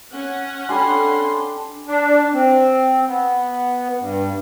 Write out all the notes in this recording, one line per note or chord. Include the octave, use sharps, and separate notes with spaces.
C#4 F#5
D4 G4 A4 G#5 B5 C6
D4
C4
B3
G2